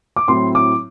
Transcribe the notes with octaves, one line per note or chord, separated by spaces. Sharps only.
D6
A2 F#3 C4 E4 C6
D6